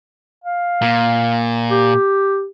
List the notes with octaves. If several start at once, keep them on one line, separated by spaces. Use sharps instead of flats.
F5
A#2
G4